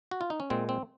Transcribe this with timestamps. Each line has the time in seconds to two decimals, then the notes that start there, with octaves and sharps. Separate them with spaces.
0.11 F#4
0.21 F4
0.30 D#4
0.40 C#4
0.50 A#2 G#3 C4
0.69 C4